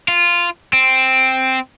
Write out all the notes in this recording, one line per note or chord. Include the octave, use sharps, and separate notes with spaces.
F4
C4